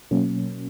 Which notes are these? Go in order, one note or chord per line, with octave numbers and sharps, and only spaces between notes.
B2 F#3 A#3 C#4